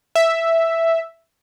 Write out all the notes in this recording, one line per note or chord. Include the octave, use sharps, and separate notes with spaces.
E5